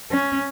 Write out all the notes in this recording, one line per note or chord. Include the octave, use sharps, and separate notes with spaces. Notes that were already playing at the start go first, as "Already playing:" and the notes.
C#4